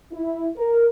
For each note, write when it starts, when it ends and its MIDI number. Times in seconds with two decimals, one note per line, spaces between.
0.13 0.48 64
0.57 0.87 70